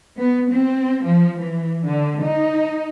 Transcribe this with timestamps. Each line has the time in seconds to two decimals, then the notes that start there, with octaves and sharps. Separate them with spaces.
0.18 B3
0.51 C4
1.03 F3
1.37 E3
1.84 D3
2.23 D#4